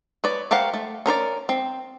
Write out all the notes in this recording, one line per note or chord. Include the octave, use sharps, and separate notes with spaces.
B4 C#5 D5
G4 A#4 C5 F5 F#5
A3
C#4 A#4 C5 D5
C4